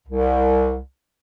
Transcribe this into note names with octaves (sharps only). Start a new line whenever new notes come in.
C2